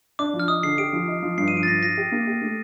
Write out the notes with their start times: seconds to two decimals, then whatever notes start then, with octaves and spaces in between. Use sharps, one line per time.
0.19 D4 D6
0.34 F3
0.40 F6
0.48 D#4 D#6
0.63 D3 C7
0.78 G4 D7
0.93 F3
1.08 D#4
1.23 F3
1.38 G2 C7
1.48 D#7
1.53 F3 D7
1.63 A6
1.67 G2 A#6
1.82 F3 A#6
1.97 G4
2.12 A#3
2.27 G4
2.42 A3